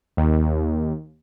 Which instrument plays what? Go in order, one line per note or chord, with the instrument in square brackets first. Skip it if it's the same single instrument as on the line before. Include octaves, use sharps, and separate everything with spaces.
[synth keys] D#2